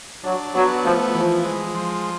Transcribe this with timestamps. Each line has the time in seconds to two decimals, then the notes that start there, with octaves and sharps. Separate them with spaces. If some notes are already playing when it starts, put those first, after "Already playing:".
0.24 F#3 D4
0.54 F#3 B3
0.84 F3 A3
1.15 E3 F3
1.44 G#3
1.74 F3